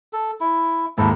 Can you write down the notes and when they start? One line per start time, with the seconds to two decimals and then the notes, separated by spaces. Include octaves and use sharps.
0.13 A4
0.40 E4
0.98 D#2 G#2 E4 A4